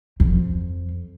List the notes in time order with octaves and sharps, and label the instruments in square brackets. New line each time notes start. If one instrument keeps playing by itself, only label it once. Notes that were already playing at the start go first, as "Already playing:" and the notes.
[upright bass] F2